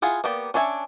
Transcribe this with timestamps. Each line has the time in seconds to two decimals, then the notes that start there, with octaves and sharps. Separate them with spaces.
0.02 E4 F4 G#4 F#5
0.24 A#3 B3 G4 D5
0.54 C#4 D4 C#5 E5 G#5